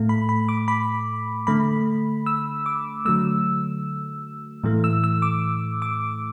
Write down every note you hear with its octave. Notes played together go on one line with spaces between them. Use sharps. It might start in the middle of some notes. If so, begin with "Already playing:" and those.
Already playing: A2 A3
B5
B5
D6
B5
D3 A3 B5
E6
D6
D3 F#3 A3 E6
A2 E3 A3
E6
E6
D6
D6